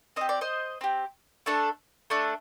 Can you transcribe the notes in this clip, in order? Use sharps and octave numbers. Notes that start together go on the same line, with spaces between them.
C4 G4 D#5
D5
C5 D#5
C4 G4
A3 D4 A4
A3 D4 A4